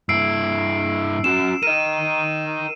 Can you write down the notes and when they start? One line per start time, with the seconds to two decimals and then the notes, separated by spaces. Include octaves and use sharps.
0.09 G2 E4 E6 C7 D7
1.24 C#4 F#4 E7
1.63 A#4 D#5 D#7